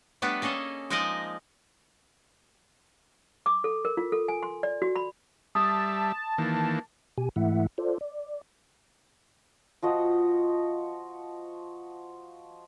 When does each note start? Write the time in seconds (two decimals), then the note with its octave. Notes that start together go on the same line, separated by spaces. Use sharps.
0.22 G3 A3 B3 D4 B4
0.42 A#3 C#4 G#4 A4 D#5
0.90 F3 G#3 D#4 A#4 D5 D#5
3.46 D6
3.64 A4
3.85 A#4
3.97 F4
4.12 A4
4.28 G#5
4.43 C6
4.63 D5
4.82 F#4
4.96 B5
5.55 G3 E5 A5 D#6
6.38 D#3 E3 A#3
7.18 B2 G4 G#5
7.36 G#2 E3 A3 E4 E5 F#5
7.78 F4 A4 C5 D5
8.01 D5
9.82 F3 F#4 D#5